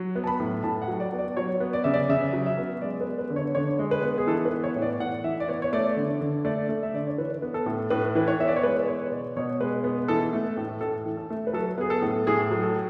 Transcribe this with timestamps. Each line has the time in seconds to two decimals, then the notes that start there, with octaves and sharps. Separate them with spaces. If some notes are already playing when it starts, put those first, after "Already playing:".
Already playing: F#3
0.15 B3
0.24 A5
0.27 B5
0.40 A2
0.64 A2 A5
0.82 F#5
0.88 F#3
1.00 D5
1.13 B3
1.18 D5
1.37 F#3 C#5
1.60 B3
1.73 D5
1.84 C#3 E5
1.94 D5
2.09 C#3 E5
2.33 F#3
2.46 E5
2.58 B3
2.82 G#3 D5
3.01 B4
3.06 B3
3.18 B4
3.30 D3
3.36 C#5
3.55 D3 C#5
3.79 G#3
3.91 B4
4.02 B3
4.18 G#4
4.27 E3 A4
4.45 B4
4.51 B3
4.64 C#5
4.75 A2
4.82 D5
5.00 A2 F#5
5.24 E3 E5
5.40 D5
5.48 B3 C#5
5.62 C#5
5.73 A3 D5
5.97 D3
6.21 D3
6.45 A3 D5
6.69 A3
6.83 E5
6.94 D3 D5
7.07 C#5
7.18 E3 B4
7.42 B3
7.54 A4
7.66 A2
7.90 A2 B4
8.15 E3 B4
8.28 C#5
8.39 B3 E5
8.48 D5
8.56 C#5
8.63 G#3 B4
8.83 B4
8.88 B3 C#5
9.12 B2 D5
9.36 B2 C#5
9.61 G#3 B4
9.84 B3
10.08 E3 A4
10.33 A3
10.57 A2
10.81 A2 A4
11.06 E3
11.17 A4
11.30 A3
11.47 B4
11.53 F#3 A4
11.78 B3 G#4
11.90 A4
12.02 A2
12.27 A2 G#4
12.51 F#3
12.63 A4